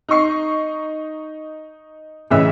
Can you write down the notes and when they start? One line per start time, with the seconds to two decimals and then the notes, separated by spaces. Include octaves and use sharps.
0.09 D#4 D#5 C#6 C7
2.30 A1 C#3 E3 D#5 E5 E6